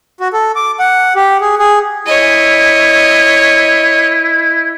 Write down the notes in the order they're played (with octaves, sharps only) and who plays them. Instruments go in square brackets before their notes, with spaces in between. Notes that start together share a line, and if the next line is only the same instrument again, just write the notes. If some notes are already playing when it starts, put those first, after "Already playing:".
[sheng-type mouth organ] F#4
A4
D6
F#5
G4
G#4
G#4
[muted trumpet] E4 [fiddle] C#5 D#5